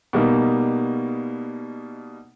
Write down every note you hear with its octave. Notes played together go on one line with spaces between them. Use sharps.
B2 G3 A#3 D#4